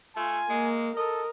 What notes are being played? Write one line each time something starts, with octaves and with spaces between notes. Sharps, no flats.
A3 F4 G#5
G#3 A#3
A4 A#4 D#5